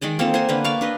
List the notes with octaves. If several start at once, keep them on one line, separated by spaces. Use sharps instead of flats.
D#3 G#3 D5 D#5
A#3 C4 F4 A4
C5 F#5 G#5 C6
D3 A#3 B4
D5 F5 C#6
D4 B4 D#5